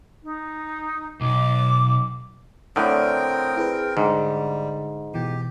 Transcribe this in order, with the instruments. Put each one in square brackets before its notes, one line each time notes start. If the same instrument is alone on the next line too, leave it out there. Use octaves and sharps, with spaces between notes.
[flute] D#4
[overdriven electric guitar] B1 [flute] D6
[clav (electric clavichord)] A2 D3 [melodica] C4 A#4 G5 [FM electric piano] D5 D#6
[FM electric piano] E4 G#4 B4
[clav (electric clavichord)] G#2 [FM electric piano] D3 [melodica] G3
[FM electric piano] B2 E3 [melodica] G4